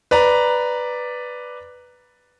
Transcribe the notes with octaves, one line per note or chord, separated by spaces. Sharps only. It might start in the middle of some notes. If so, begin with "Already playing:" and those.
B4 D5 A#5